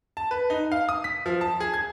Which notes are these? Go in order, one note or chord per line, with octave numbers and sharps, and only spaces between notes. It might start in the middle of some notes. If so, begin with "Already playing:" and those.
A5
B4
D#4
F5
D#6
B6
F3
A5
G#4
G#6